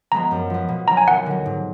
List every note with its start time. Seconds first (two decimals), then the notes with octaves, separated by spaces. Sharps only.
0.12 F3 G#3 B3 A#5
0.31 F#2
0.50 F3 B3
0.68 B2
0.88 F#3 D4 A#5
0.97 G#5
1.07 D#2 F#5
1.26 D3 F#3
1.46 G#2